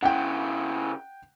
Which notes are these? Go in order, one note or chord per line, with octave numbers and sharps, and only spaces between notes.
C#3 E4 F#5 G5